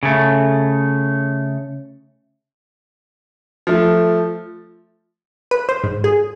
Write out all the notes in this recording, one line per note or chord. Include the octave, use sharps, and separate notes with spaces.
C#3 A3
F3 A3
B4
C5
G#2
G#4